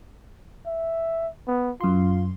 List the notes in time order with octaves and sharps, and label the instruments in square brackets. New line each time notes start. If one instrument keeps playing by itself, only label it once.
[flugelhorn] E5
B3
[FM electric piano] F#2 C6 [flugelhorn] F4